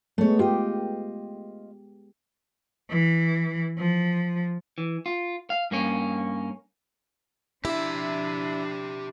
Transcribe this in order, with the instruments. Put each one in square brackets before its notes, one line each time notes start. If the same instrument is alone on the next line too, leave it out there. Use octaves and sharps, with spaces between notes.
[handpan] G#3 B3 [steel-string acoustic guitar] A3 C#5
[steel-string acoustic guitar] F4 D#5 [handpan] G4
[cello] E3
F3
[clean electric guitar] E3
F4
F5
G2 A#3 C#4
[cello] F3 D4 [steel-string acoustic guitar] E4 [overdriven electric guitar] G4 E5